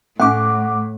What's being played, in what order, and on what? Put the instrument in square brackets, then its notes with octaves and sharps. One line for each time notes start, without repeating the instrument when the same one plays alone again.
[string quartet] A2 [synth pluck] A3 C#4 [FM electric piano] F#5 D6